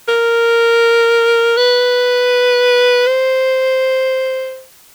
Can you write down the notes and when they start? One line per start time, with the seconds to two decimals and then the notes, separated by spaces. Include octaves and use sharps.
0.08 A#4
1.57 B4
3.06 C5